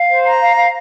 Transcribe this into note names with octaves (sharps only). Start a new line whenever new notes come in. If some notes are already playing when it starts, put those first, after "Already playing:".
Already playing: F5
C5
A#5
F5
F5